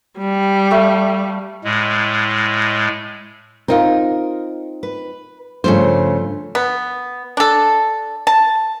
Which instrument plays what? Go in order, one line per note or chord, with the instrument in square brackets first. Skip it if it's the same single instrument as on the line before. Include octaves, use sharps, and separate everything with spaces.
[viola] G3
[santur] A3 F5
[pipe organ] A2 G#3
[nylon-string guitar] C4 D#4 F4 [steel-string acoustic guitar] A#4
[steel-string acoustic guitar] B4
[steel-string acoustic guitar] G2 F3 A3 [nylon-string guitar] C#3 C5
[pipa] B3
D4 A4
A5